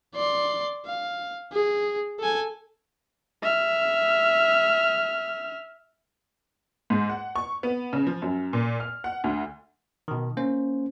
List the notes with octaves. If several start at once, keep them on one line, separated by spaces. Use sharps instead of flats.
D5 C6
F5
G#4
A4 G#5
E5 F6
G#2
F#5
C#6
B3
C#3
F3
F#2
A#2
F6
F#5
D2
B2 D#3
A#3 C#4 C5